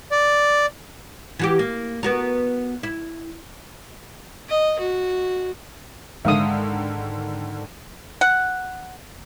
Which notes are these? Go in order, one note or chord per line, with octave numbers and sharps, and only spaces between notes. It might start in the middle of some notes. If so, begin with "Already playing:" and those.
D5
E3 F#4 G4
A#3
B3 F#4 A#4
E4
D#5
F#4
G#2 D3 D#3 G#3 E5 F5 D#6
F#5